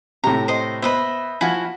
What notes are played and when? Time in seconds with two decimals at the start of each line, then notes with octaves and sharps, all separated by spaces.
0.24 A2 C3 A#5
0.48 C5 D#5
0.82 B3 B4 C5 D#5 E5
1.41 F3 E4 F#4 F5 G#5